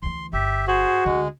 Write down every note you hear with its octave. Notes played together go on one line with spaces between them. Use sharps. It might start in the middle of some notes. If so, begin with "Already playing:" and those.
D2 E3 C6
G1 G4 E5
F#4 G#4 C5
D2 D3 G#3